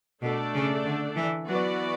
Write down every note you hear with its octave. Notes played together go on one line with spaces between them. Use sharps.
B2 A3 D4 A4 D5
C#3
D3
E3
E3 F#3 B3 F#4 B4 D5